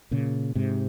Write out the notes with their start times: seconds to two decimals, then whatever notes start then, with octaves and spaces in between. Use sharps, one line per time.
0.11 A#2 C#3
0.55 G#2 C3